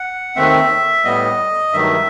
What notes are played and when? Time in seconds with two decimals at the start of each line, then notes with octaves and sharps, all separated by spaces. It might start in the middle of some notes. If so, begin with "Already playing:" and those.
Already playing: F#5
0.36 D#2 D#3 A3 C4 E5
1.04 A2 G3 B3 D#5
1.72 G2 D#3 F#3 A3 E5